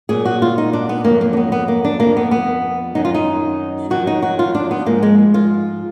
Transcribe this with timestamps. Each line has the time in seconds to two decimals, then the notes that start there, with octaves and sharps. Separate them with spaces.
0.09 A#2 F#3 G#4
0.25 F#4
0.42 F4
0.58 D#4
0.73 D4
0.89 B3
1.04 F2 D3 F#3 A#3
1.21 A#3
1.33 D4
1.37 B3
1.52 B3
1.68 A#3
1.85 D4
2.00 F2 F3 A#3
2.17 B3
2.31 B3
2.95 F#2 D#3 F#3 D#4
3.05 F4
3.14 D#4
3.90 F2 D#3 F#3 F#4
4.07 D#4
4.22 F#4
4.39 F4
4.55 D4
4.71 B3
4.86 G#2 F3 A#3
5.03 G#3
5.34 F4